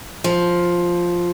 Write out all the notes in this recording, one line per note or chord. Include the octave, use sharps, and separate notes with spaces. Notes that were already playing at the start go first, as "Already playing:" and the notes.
F3